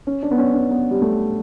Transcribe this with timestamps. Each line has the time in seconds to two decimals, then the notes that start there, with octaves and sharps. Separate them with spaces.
0.07 C#4
0.23 D4
0.31 B3
0.38 C#4
0.55 C#4
0.71 B3
0.91 G3
1.02 A3